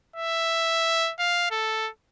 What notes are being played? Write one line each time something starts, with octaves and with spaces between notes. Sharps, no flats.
E5
F5
A4